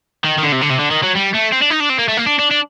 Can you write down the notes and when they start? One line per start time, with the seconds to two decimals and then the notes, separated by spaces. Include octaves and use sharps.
0.24 D#3
0.38 D#3
0.43 D3
0.52 C3
0.61 D3
0.69 C3
0.79 D3
0.91 D#3
1.04 F#3
1.16 G3
1.35 A3
1.53 C4
1.62 D4
1.71 D#4
1.80 D4
1.90 C4
1.99 A#3
2.09 A3
2.17 A#3
2.26 D4
2.39 D4
2.51 D4